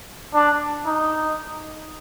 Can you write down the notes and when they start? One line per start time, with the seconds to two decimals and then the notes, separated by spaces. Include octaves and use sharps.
0.34 D4
0.87 D#4